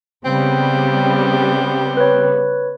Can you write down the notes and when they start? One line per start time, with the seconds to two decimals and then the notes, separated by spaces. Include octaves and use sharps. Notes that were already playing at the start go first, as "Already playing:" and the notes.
0.25 C#3 G3 B3 C4
1.97 B4 C#5